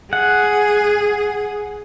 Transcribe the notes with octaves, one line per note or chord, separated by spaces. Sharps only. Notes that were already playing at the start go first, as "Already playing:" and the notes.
G#4 F#5